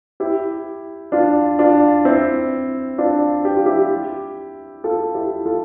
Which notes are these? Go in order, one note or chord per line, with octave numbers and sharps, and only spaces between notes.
E4 G4
D4 F4
D4 F4
C4 E4
D4 F4
G4
F4
E4 G4
F4 A4
E4 G4
F4 A4